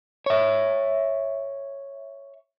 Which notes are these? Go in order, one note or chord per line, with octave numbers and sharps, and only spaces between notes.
C#5 E5